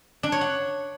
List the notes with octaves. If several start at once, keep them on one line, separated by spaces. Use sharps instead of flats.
D4
C#5
F#5